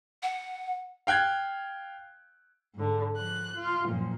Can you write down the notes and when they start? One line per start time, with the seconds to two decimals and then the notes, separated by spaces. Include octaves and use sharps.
0.23 F#5
1.07 F5 G5 F#6 G#6
2.74 G#2 D3
3.15 F3 F#6
3.55 F4
3.86 F#2 A#2 F3